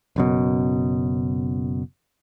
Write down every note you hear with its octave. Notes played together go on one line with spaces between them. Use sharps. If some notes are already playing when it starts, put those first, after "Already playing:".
F#1 F#2 B2